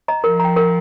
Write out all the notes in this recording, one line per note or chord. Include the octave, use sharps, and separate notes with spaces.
D#5 A#5
F3 A#4
G5 A#5
A#4